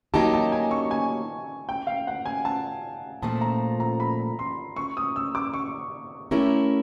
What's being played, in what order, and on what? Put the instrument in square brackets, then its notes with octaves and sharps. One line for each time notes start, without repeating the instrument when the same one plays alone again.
[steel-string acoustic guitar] F#3 A#3 D#4 G4 [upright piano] A5
[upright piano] A5
G#5
C#6
G#5
G5
F5
F#5
G#5
A5
[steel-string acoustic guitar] A#2 F3 A3 [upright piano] A5
[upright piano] A#5
A#5
B5
C6
C#6
D#6
E6
D6
C#6
[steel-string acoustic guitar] A3 C#4 E4 G4 A#4